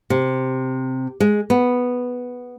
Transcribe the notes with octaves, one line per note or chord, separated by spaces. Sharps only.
C3
G#3
B3